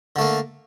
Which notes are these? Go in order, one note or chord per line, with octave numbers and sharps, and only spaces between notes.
D3 A3 A#3